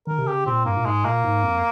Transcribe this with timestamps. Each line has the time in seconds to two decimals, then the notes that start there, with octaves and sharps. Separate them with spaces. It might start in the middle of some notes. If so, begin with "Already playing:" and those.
0.07 D#3 A#4
0.18 C3
0.27 C#3 G4
0.46 A#2 C4
0.65 G2 A#3
0.77 A#2
0.85 G#2 G#3
1.04 A#2 A#3
1.24 G#2
1.43 F2